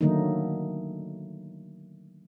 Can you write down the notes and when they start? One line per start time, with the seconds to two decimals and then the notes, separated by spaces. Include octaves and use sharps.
0.01 D3 D#3 F#3 A3 A#3 D#4